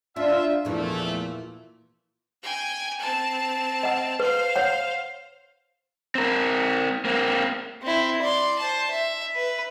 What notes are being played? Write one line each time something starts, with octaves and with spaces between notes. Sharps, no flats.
D4 F4 E5
E2 A#2 E3 F3 A3
G5 G#5
C4 A5
D#5 F#5
B4 C5 F5
C#5 F#5
C4 A#4
A#3 C4
C4 E4
D5 C6
C5 A5
E5
B4